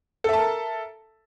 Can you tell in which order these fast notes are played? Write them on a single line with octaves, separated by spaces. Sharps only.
A4 E5 A5 A#4